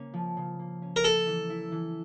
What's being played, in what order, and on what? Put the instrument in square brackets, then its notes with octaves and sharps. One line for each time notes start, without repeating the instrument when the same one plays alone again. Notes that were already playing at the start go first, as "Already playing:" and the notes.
Already playing: [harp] C#3 A#3 C#4
F3
C#3
A#3
C#4
[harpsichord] A#4
[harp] A#3 [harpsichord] A4
[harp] E3
E4
E3